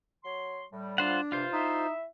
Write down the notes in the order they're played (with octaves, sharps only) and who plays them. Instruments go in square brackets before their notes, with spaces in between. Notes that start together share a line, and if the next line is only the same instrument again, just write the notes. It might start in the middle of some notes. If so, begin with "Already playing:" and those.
[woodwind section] F#3 C#5 C6
A2 G3
[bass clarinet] D4 [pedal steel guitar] F4 C5 F#5
[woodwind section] G2 C3 [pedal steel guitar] F4 C5
[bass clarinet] D#4 [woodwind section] E4 E5